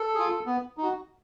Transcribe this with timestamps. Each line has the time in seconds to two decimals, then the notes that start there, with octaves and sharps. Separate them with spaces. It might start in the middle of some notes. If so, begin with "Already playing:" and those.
Already playing: A4
0.15 F4 G#4
0.46 B3
0.77 D#4
0.83 F#4